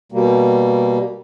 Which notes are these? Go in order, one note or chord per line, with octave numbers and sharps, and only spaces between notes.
B2 G3 A#3